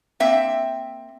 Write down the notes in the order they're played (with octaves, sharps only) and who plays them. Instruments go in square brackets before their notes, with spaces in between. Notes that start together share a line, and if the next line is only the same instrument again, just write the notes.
[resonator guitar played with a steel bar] A#3 C4 E5 G5